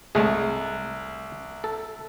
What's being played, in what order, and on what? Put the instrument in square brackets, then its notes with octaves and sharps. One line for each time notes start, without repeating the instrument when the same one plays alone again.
[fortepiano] C2 [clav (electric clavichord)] G#3 A3 G#4
[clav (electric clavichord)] A4